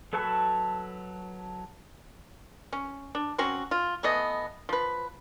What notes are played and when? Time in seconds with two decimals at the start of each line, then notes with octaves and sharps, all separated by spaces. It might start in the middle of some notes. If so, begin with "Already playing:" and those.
0.13 F#3 A4 B4 A5 C#6
2.73 C#4
3.15 D4
3.38 F#3 C4 C#4 F#4
3.71 F4
4.03 E3 A3 B3 D#5
4.69 F3 B4